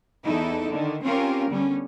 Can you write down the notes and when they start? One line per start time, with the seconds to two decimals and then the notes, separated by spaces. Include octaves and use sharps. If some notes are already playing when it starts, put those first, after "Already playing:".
0.23 E2 D#4 E4 A4
0.69 D3 D#3
1.02 C4 C#4 F4 G4 A#4
1.48 D3 G3 B3 C#4